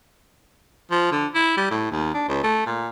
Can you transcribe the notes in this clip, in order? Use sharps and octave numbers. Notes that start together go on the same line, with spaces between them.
F3
D3
E4
G3
A2
D#2
D4
C#2
A3
A#2